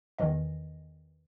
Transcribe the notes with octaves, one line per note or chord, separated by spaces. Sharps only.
E2 D#3 E3 D#5